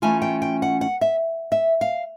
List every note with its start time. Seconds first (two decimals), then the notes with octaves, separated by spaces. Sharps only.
0.02 E3 A3 C#4 F4 G#5
0.22 G5
0.42 G5
0.62 F#5
0.81 F#5
1.01 E5
1.52 E5
1.81 F5